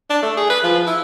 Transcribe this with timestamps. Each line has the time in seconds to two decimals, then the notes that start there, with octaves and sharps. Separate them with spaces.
0.10 D4
0.22 A3
0.37 G#4
0.50 B4
0.64 F3
0.87 E4